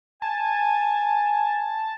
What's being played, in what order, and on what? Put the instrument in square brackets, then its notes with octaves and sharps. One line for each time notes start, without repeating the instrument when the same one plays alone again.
[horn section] G#5 [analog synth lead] A5